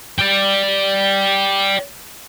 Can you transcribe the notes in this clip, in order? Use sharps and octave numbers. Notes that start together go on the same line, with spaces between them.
D5 G5